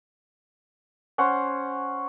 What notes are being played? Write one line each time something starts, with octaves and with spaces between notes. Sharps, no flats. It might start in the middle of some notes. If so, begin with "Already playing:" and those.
C#4 C5 F#5